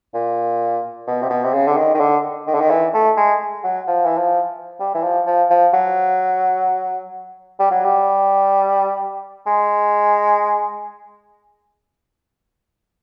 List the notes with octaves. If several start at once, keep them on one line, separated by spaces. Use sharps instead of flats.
A#2
B2
C3
B2
C3
C#3
D3
D#3
D#3
D3
D#3
D3
D#3
E3
A3
G#3
F#3
F3
E3
F3
G3
E3
F3
F3
F3
F#3
G3
F#3
G3
G#3